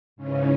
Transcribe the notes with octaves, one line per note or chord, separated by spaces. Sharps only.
G#2 C#3 E3 C#4